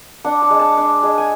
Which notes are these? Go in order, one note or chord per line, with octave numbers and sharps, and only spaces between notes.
D4 F#5
A5
G#3
A5
D4
G#3
G#5